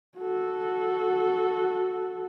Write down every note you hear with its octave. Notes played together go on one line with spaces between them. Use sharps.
F#4 A4